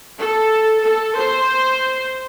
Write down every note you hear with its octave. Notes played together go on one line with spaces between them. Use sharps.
A4
A4
C5